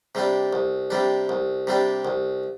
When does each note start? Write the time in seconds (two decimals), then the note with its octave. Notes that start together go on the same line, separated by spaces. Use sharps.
0.15 C3 G3 D4
0.53 C2
0.90 C3 G3 D4
1.29 C2
1.67 C3 G3 D4
2.05 C2